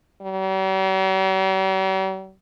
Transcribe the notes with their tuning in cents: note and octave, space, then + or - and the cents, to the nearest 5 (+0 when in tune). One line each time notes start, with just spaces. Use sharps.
G3 -45